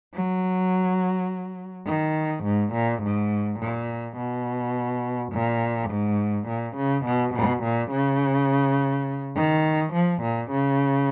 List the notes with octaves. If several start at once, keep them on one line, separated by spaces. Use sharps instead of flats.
F#3
D#3
G#2
A#2
G#2
A#2
B2
A#2
G#2
A#2
C#3
B2
B2
A#2
C#3
D#3
F3
A#2
C#3